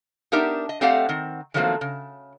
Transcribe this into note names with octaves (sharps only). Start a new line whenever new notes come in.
B3 D4 D#4 G4 A#4 E5
D#5
A3 C4 G4 D5 F5 F#5
D#3 C4
D#3 F3 F#3 A3 A#3 C4
C#3